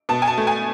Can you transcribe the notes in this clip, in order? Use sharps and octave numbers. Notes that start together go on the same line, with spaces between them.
B2 A5
G#5
A5
A3
G#5